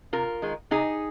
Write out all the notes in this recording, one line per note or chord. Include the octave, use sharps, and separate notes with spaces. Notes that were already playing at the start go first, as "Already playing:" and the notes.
C3 F4 A#4
D#3 G#3
C3 D#4 G#4